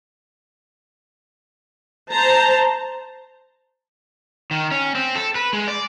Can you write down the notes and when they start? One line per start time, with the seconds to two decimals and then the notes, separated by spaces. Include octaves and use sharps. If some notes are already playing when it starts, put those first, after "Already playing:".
2.10 C5 A5 A#5
4.51 D#3
4.71 C#4
4.95 C4
5.15 A4
5.35 B4
5.53 G#3
5.68 D5